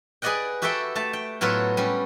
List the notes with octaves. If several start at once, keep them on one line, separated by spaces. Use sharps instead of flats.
G#4 B4 D5 D#5 F#5 G5
F#4 G4 A4 B4 E5 G5
A3 A5
G5
A2 F#3 B3 F4 A4 B4
G3 C#4